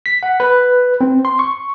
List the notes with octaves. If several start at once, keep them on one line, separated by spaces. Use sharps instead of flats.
B6
F#5
B4
C4
C6
C#6